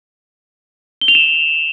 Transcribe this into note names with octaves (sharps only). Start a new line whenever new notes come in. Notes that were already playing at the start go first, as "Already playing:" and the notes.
G7
F7
E7